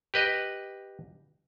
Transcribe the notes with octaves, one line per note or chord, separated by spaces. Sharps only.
G4 B4 D#5